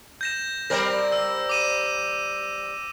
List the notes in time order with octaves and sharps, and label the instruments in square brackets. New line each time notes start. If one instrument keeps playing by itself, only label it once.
[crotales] G6 A#6 E7
[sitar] G3 C4 A#4 [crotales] A#6
[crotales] E6
D6 D#7 E7